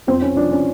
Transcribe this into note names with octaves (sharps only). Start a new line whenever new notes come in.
F2 C4
C#4
F3 D4
C#4